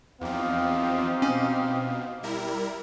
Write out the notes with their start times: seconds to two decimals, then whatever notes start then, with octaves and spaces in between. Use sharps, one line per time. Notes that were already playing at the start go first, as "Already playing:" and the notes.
0.21 E2 F3 C4 D#4 G4 F5
1.22 B2 C#4
2.23 G3 E4 A#4